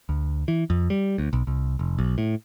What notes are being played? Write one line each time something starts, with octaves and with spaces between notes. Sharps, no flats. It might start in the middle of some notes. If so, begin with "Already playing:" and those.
D2
E3
F2
G3
D2
B1
C2
F1
B1
A2